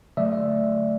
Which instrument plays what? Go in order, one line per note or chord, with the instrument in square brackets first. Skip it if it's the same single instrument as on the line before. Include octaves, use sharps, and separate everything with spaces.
[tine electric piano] D3 F#3 A3 D5 E5